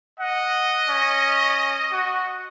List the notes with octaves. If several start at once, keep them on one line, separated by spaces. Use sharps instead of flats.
D#5 F#5
C#4
F#4